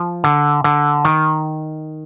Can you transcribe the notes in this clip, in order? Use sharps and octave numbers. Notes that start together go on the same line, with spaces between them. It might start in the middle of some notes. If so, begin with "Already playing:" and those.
Already playing: F3
D3
D3
D#3